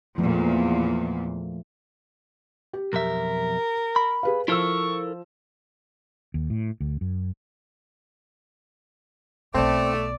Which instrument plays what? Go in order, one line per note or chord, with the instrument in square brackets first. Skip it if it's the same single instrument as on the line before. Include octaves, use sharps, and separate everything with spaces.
[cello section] E2 A#2 [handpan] F3 A3
[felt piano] G4
[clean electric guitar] B1 F2 E5 [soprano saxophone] A#4
[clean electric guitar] B5
[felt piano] G#4 B4 F5
[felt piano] F3 E6 [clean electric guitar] E4 A4 A#4 [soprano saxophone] C#6
[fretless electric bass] D#2
A2
D2
F#2
[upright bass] B1 B2 [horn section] A3 [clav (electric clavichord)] C4 [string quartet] D5